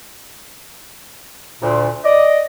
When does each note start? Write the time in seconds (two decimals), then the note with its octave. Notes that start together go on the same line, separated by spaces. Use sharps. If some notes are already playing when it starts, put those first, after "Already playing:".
1.62 D2 A#2
2.05 D5 D#5